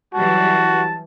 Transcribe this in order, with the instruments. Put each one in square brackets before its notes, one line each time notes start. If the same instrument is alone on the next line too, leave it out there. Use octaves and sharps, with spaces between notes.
[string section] E3 F#3 G3 [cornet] F#4 [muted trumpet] A5